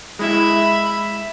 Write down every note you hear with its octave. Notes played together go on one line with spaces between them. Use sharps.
G#3 E4 E5 B5